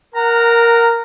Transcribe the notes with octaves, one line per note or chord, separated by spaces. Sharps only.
A#4 F#5 A#5